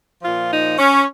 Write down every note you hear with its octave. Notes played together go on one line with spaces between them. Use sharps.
A#2 F3 F4
D#4
C#4